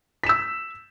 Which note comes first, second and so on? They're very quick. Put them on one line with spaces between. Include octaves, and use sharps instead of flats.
B6 E7 E6